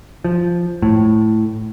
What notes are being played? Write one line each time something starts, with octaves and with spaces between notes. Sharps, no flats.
F3
A2